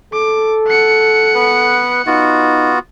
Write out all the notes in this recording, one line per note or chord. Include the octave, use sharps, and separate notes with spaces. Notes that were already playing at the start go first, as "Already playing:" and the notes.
A4 D6
F#5 C#7
B3 B4
B3 D#4 F4 F#4